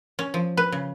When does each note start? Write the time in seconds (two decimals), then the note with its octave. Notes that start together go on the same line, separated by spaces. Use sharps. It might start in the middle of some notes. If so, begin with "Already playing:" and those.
0.19 C#4
0.34 F3
0.57 B4
0.72 C#3